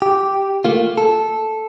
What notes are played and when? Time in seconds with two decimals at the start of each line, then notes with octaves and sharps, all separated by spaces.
0.02 G4
0.65 A3 A#3 F4
0.98 A4